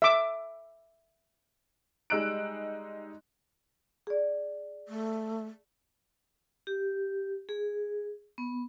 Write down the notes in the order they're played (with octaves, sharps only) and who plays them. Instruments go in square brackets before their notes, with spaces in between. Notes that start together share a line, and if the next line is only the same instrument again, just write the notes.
[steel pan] E5 D6
[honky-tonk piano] G3 G#3 D#4 E6 F#6 D7
[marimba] G#4 D5
[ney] A3
[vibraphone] G4
G#4
B3